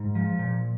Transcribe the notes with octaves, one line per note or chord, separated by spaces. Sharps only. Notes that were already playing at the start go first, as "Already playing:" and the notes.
Already playing: G#2
F3
A#2